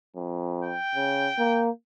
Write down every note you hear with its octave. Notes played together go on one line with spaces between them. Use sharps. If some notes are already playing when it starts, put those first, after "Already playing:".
F2
G5
C#3
A#3